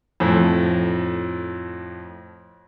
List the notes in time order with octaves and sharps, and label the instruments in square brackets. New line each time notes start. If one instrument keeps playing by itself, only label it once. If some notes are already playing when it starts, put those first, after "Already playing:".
[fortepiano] F2 A2